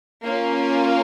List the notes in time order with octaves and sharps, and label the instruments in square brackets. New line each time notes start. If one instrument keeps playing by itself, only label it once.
[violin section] A#3 C#4 F4